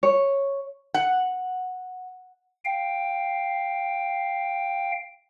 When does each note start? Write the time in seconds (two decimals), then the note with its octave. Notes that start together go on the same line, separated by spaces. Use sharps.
0.03 C#5
0.94 F#5
2.65 F5 G5